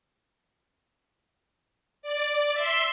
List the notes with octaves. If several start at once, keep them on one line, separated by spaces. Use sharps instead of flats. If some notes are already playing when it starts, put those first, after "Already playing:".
D5
E5 C6